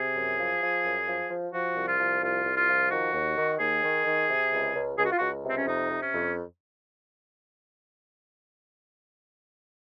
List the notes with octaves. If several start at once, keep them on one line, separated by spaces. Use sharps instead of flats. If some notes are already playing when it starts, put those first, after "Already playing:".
Already playing: C3 G#4
F#2
F3
F3
F#2
F3
F3
F3 F#4
C2
F4
F3
C2 F4
C2
F4
F3
D#3 F#4
D#2
D#3
D#2 G#4
D#3
D#3
C3
C#2
C#2
C#2 G#4
F#4
F4
C#2 F#4
C3 C4
C#4
F2 D#4
C3
C#4
F2